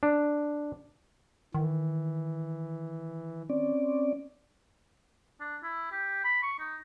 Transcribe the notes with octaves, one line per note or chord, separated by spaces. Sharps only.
D4
D#3 E3
C4 C#4 D5
D4
E4
G4
B5
C#6
D#4